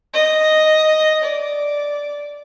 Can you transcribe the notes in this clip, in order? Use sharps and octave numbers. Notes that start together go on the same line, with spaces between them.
D#5
D5